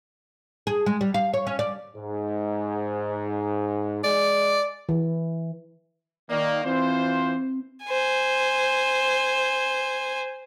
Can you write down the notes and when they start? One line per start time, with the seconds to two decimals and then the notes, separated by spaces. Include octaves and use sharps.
0.67 G#4
0.86 G#3
1.01 G3
1.14 F5
1.34 C#5
1.47 C#4
1.59 D5
1.96 G#2
4.04 G#3 D5
4.89 E3
6.30 D#3 A#3 D5
6.65 E3 C4 F4 C5
7.85 C5 G#5